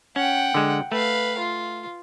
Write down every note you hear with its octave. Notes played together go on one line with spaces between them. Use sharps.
C#4 F#5 G5
D3 G#3
A3 B4 F5
F4